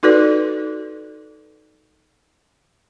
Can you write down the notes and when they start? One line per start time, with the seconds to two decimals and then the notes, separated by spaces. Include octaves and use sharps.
0.03 D#4 F#4 A4 B4 D5